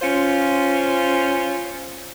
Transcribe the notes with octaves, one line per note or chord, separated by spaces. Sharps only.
C#4 F4 C5